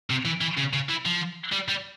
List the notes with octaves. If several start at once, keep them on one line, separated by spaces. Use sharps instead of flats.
C3
E3
E3
C#3
C#3
E3
F3
G3
G3